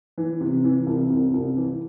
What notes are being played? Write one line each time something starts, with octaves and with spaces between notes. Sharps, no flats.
E3
C3
E3
C2
C2
C2
E3